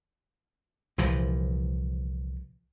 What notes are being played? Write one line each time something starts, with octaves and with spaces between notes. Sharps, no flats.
C2 A#2 E3 F3